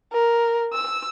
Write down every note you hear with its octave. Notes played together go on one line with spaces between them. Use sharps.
A#4
E6